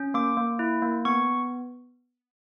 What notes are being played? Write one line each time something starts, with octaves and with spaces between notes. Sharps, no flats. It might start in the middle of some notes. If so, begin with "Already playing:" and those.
Already playing: C#4
A#3 D6
A#3
E4
A#3
B3 C#6